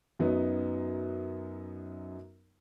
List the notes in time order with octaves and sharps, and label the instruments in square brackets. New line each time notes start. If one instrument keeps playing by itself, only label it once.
[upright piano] F#2 F#3 B3 D#4